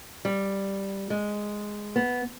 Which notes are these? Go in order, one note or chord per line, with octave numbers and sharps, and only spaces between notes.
G3
G#3
B3